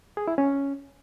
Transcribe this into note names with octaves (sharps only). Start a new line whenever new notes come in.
G#4
E4
C#4